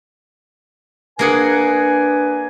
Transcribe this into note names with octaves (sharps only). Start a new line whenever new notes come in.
A#3 D4 G#4 B4 F#5 G#5